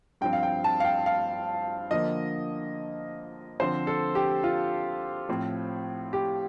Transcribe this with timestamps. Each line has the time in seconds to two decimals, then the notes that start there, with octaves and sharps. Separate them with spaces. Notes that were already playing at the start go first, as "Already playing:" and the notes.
0.21 G2 F3 C4 G5
0.33 F5
0.43 G5
0.64 A5
0.80 F5
0.85 G5
1.06 F5
1.91 D3 F3 A#3 D#5
3.60 D3 F3 C4 C5
3.87 A4
4.15 G4
4.44 F4
5.29 A2 F3 C4
6.13 G4